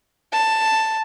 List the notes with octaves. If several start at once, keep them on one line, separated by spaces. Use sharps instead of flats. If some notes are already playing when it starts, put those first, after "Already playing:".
A5